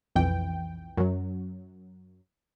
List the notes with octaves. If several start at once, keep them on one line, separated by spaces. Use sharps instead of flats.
B1 F2 E3 G5
F#2 F#3